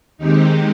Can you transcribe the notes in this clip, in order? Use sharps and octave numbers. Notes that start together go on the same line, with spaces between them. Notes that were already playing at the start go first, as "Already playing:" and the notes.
D#2 D#3 G#3 C4 D#4 G4